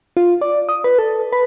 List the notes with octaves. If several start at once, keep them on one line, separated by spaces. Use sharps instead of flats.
F4
D5
D#6
B4
A4
B4